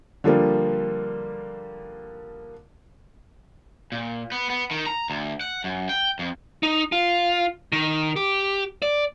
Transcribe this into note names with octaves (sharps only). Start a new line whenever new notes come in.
D3 F3 G3 A#3
A#2
B3
B3
D#3
A#5
D2
F#5
F#2
G5
F2
D#4
F4
D#3
G4
D5